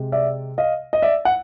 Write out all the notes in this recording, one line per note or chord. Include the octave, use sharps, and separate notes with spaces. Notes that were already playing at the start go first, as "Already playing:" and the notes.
Already playing: C3 G#3
D5 E5
D#5 F5
D#5
D5 E5
F#5